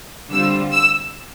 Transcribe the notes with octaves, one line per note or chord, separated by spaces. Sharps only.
D3 G3 C4 F4 E6
E6